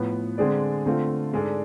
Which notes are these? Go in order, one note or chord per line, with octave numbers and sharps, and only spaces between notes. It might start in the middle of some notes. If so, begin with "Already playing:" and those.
Already playing: A2 F3 B3
D3 G#3 C4 G#4 D5
D3 A3 C4 F4
G#2 G#3 D4 A4 D5